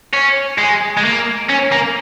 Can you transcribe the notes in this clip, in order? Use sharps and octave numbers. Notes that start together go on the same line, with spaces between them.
C#4
G#3
G#3
A#3
C#4
A#3